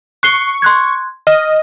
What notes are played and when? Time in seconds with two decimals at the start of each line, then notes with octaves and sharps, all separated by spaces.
0.23 C#6 F#6 C7 G7
0.62 C6 F#6 G#6
1.27 D#5 F6